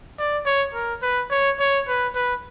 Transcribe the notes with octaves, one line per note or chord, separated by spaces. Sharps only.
D5
C#5
A#4
B4
C#5
C#5
B4
B4